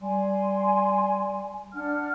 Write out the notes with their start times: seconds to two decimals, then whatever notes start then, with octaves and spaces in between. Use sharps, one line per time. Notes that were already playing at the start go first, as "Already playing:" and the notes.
0.01 G3 G#5 C6
1.73 D4 F#5 F6